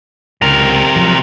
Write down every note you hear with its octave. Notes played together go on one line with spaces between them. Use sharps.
C#2 C3 A#4
F3 F#3